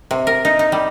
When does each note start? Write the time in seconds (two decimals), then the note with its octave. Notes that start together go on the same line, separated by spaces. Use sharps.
0.11 C3
0.27 A#4
0.45 D#4
0.59 D#4
0.72 G3